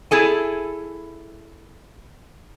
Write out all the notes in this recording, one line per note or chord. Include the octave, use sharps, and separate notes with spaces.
E4 G#4 A4 G#5